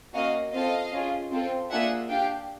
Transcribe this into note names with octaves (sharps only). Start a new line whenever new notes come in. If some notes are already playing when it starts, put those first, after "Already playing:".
A#3 C#4 F#4 D#5 F5
C4 F4 A4 D#5 F5
C#4 F4 G#4
C4 F4 A4
A#3 D4 F4 G#4 E5 F#5
D4 G4 F5 G5